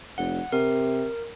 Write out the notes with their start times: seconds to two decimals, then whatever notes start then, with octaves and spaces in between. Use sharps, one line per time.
0.18 F1 F#5
0.52 C3 A#4